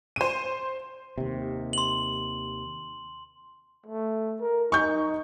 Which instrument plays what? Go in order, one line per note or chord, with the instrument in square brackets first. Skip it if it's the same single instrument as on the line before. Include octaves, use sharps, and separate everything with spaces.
[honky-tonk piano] C5 D#7
[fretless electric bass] D#2 C3
[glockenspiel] C6 F#7
[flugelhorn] A3
A#4
[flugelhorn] D#4 [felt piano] C#6 G6